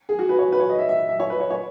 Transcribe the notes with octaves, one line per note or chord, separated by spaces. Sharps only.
G#4
F#4
B4
C#5
B4
C#5
D#5
E5
E5
E5
C#5
B4
C#5
C#5